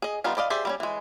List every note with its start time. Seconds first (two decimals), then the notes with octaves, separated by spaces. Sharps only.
0.02 G#4 D#5
0.24 D#3 G3 B3 F4
0.37 B4 D5 D#5 F5
0.50 G4 G#4 C5 D5 E5
0.65 G3 C4 C#4
0.80 E3 G#3